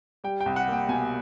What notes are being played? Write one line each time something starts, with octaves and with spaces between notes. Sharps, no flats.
G3 G5
G5
C2
F#5
A#3
G5
B2 G#5